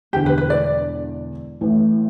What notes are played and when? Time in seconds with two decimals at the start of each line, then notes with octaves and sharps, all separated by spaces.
0.13 E1 E2 D3 G4
0.26 B4
0.38 B4
0.50 D5
1.61 A1 A2 E3